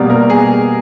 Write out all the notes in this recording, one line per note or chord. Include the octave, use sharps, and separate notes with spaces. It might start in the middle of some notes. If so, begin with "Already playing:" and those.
Already playing: B2 G3 A#3
A#4
G#4